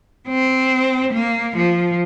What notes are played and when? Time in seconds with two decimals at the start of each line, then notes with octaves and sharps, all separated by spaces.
0.28 C4
1.13 A#3
1.56 F3